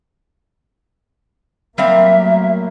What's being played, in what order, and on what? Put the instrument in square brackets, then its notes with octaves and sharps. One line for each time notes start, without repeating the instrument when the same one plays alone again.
[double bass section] F#3 A3 A#3 [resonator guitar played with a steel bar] G3 C4 F5 [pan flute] E5